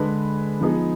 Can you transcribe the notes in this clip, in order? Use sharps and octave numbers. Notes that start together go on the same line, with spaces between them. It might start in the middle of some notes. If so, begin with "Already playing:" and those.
Already playing: D3 G#3 D4 G#4 B4
F3 B3 D#4 G#4